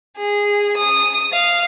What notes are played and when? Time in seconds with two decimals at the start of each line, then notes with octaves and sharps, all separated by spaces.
0.15 G#4
0.76 D#6
1.31 F5